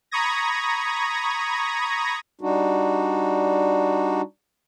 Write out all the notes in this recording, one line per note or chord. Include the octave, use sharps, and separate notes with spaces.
A#5 B5 C#6 D#6 G#6 A#6
G3 D4 D#4 F#4